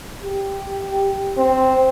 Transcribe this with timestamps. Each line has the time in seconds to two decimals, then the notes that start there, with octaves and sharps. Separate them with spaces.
0.23 G4
1.37 C4